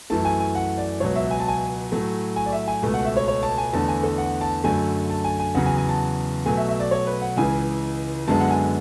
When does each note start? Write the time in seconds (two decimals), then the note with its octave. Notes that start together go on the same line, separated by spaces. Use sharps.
0.10 F#2 E3 A3 A5
0.25 G#5
0.40 G#5
0.55 F#5
0.78 D5
1.00 C#2 B2 F#3 C#5
1.16 E5
1.31 G#5
1.40 A5
1.48 G#5
1.92 A2 F#3 A3
2.36 G#5
2.46 D5
2.53 E5
2.68 G#5
2.83 C#2 B2 A3
2.94 F#5
3.05 E5
3.17 C#5
3.28 C#5
3.43 A5
3.58 G#5
3.73 E2 D3 A3 A5
3.88 G#5
4.04 A4
4.18 F#5
4.41 A5
4.64 F#2 D3 A3 G#5
5.10 A5
5.24 G#5
5.40 G#5
5.55 E2 C#3 F#3 F#5
5.66 G#5
5.78 G#5
5.89 A5
6.46 B2 F#3 A3 G#5
6.57 E5
6.69 E5
6.80 D5
6.91 C#5
7.07 B4
7.22 F#5
7.37 C#2 C#3 E3 G#5
8.28 F#2 D3 G#3 B3 A5
8.40 F#5
8.51 G#5